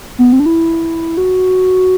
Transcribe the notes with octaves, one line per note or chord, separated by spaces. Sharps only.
B3
C4
D4
E4
F#4